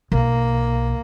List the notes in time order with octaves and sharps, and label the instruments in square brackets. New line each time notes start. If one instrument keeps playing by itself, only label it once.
[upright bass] B1 [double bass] A#3